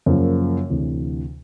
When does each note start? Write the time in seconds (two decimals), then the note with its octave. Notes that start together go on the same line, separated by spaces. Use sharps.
0.06 F#2 C#3 F3 A#3
0.70 D2 C3 E3